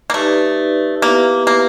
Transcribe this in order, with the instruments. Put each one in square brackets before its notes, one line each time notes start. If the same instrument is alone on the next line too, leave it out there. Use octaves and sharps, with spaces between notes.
[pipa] A#3
[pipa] A3 [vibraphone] D#4 G4 B4 D5
[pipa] A#3 [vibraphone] B3 E4 G4 B4 E5
[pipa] A#3